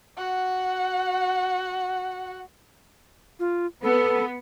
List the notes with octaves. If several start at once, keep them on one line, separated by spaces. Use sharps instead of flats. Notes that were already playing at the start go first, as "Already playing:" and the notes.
F#4 F#5
F4
B3 A4